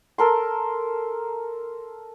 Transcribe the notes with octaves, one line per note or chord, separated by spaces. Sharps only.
A4 A#4 C6